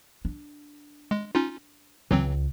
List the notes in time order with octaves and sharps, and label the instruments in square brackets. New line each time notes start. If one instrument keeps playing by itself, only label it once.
[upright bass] D4
[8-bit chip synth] G#3
C#4 D#4 F4
[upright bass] C#2 [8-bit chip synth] E3 F#3 C4